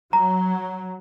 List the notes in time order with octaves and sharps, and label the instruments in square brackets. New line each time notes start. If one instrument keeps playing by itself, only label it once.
[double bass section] F#3 [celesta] A#5